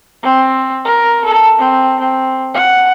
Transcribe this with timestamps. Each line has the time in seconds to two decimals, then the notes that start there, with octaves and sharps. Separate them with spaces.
0.23 C4
0.85 A#4
1.25 A4
1.58 C4
1.99 C4
2.54 F#5